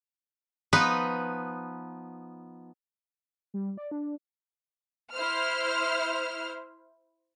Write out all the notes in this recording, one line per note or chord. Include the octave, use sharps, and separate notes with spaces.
F3 B3 D#4 B4
G3
D5
D4
E4 C5 F6